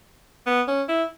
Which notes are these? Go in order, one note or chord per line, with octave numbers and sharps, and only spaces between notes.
B3
C#4
E4